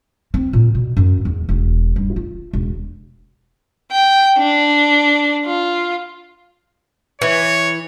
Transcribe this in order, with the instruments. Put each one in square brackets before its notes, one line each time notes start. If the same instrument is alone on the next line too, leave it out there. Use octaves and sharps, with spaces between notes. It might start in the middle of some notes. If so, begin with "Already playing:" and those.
[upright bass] C4
A#2
B2
F#2
E2
E1
G2
F4
E1
[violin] G5
D4
F4
[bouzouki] E3 [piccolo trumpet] C#5